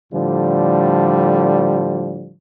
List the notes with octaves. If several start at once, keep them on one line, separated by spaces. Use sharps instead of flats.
A2 D3 F3 G3